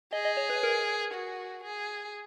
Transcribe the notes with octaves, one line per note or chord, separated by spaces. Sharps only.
G#4 D#5
D#5
C#5
B4
A#4
F#4
G#4